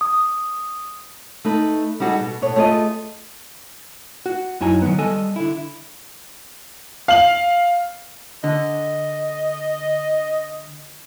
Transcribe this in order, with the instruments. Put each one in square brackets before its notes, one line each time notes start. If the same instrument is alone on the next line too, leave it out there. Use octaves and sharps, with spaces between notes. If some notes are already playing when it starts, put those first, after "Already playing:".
[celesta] D#6
[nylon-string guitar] A3 D#4 B4
G3 D#4 F#4 G#4 A4
B2
B2 A4 C#5
A3 F4 G#4 A4 D5 D#5
[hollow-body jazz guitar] F#4
F#2 D#4 E4 F#4 G#5 A#5
D#3 F#3 B3
G3 A4 D#5 G#5
D3 E4
[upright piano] F5 F#7
[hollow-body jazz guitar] D3 [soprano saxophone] D#5